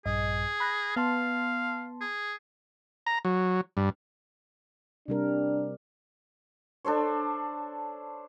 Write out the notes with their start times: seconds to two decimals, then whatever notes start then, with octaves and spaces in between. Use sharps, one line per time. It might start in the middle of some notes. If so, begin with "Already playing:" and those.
0.06 A#1 G2 G#4 D#5
0.60 B5 F#6 A#6
0.96 B3 F5 A5 C6
2.01 G#4
3.06 A#5
3.25 F#3
3.77 G2
5.08 C3 G3 D4 A#4
6.85 D4 A4 C5 C#5